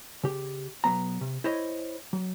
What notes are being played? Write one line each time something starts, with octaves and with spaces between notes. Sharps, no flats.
C#3 G4
B1 F#3 B3 A#5
C3
E4 C5 C#5 D#5
F#3